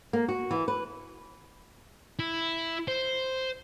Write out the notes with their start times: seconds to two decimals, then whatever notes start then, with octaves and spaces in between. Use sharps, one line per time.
0.13 A#3
0.28 F#4
0.51 E3
0.68 B4
2.19 E4
2.88 C5